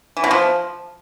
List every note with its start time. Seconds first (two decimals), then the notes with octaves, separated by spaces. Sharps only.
0.17 E3
0.24 B2
0.31 F3